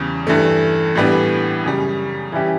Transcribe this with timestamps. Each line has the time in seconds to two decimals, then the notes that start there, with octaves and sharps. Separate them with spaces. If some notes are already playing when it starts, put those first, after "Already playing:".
Already playing: E2 C#3 G3
0.27 G2 E3 A3
0.95 A2 E3 G3 B3 D4
1.63 F#2 C#3 G3
2.32 E3 G3 C#4 E4 G4